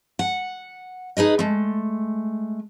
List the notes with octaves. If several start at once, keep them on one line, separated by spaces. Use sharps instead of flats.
F#5
D#4 G#4 B4 D#5
G#3 A3